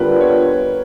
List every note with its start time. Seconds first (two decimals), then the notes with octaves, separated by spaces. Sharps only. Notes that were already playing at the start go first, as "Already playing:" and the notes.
Already playing: D3 G3 B3 D4 F4 A#4 B4
0.21 C#5